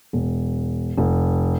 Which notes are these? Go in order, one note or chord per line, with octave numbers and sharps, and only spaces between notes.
E1
F1